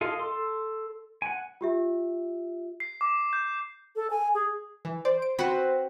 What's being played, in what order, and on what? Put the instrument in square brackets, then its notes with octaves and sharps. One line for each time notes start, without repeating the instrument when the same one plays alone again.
[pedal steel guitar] F4 G#4 A4 D#5 F5
A4 C6
F#5 G#5
[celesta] F4 G4 E5
[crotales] C7
D6
G6
[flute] A4
G#5
G#4
[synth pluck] E3
[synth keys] C5 [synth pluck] D5
[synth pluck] D7
[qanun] C4 F#4 B4 [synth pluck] F#5 B5